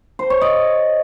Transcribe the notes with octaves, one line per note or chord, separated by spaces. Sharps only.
C5
C#5
D#5